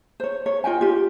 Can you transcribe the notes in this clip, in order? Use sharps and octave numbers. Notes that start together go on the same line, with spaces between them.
C5 C#5
C#5
F4 D#5 G5 G#5
F4 G4